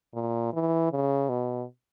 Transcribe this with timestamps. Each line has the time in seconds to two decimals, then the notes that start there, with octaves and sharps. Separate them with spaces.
0.14 A#2
0.53 E3
0.91 C#3
1.29 B2